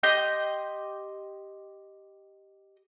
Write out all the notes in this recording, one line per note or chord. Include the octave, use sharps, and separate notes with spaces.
G4 D#5 C6 G6